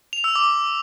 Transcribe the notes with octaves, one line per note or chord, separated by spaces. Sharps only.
F7
E6
D6